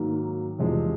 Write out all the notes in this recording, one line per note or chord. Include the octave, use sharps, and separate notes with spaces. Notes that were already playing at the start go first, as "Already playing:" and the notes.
Already playing: G#2 D#3 F#3 A#3
E2 C3 F3 G#3 C4